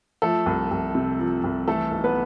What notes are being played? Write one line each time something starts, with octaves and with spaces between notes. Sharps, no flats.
F3 A3 A4
C2
C2
C3
F3
C2
E3 A3 A4
B1
B3 B4